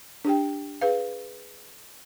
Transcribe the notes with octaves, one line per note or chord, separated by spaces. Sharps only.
D4 G4 G5
G#4 B4 F5